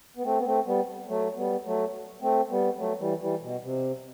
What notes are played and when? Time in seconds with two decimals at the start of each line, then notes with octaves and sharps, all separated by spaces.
0.17 B3
0.23 A3 C4
0.38 B3
0.45 A3 C4
0.66 G3 B3
1.08 F#3 A3
1.36 G3 B3
1.65 F#3 A3
2.21 A3 C4
2.50 G3 B3
2.78 F#3 A3
2.99 E3 G3
3.20 E3 G3
3.42 B2
3.62 C3